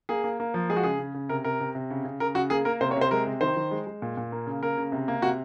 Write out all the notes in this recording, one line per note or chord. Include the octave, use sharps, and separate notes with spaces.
A#3 G#4
A#3
A#3
F3
G#3 G#4
F#4
C#3 G#4
C#3
C#3
C3 A#4
C3 A#4
C3
C3
C#3
C#3
C#3 A#4
C#3 F#4
A#3 G#4
A#3 A#4
C3 C5
C#5
C3
C5
G#3 A#4
C3
D#3 C5
D#3
G#3
G#3
A#2
A#2
A#3
C#3
A#3 A#4
C#3
C3
A#3
C3 F#4